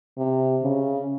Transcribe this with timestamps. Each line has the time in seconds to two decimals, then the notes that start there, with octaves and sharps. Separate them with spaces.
0.18 C3
0.63 C#3